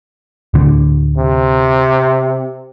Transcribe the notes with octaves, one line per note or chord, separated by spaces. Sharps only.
D1 D3
C3